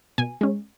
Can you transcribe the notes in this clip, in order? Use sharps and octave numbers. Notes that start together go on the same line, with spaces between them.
B2 G#5
G#3 C#4